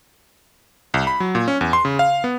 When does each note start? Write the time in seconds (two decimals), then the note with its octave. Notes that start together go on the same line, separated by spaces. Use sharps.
0.94 C2
1.07 B5
1.20 F#3
1.35 A#2
1.48 C#4
1.61 E2
1.73 C6
1.85 C#3
1.99 F5
2.24 B3